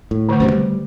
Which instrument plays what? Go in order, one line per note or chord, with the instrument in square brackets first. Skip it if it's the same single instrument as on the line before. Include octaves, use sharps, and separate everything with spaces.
[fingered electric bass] A2
[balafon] D3 D#3 A3
[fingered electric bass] F#2 A2 C3 [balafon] C5
[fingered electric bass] G3